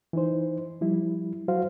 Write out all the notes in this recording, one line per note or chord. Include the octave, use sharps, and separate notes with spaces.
E3 D#4 C5
F3 G3 E4
F#3 F#4 C5 F5